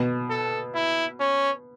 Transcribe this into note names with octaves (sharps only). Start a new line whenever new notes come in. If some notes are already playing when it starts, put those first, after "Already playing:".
Already playing: B2
A4
E4
C#4